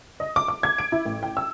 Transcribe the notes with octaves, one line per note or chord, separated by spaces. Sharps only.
D#5
D6
D6
G#6
D7
E4
A1
G5
E6